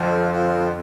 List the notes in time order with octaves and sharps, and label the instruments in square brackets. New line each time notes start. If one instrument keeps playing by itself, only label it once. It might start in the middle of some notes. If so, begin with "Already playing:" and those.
Already playing: [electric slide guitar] F2 [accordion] D3 F3 C4 F4 C5
[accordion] D3 F3 C4 F4 C5